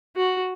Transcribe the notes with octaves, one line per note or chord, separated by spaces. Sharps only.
F#4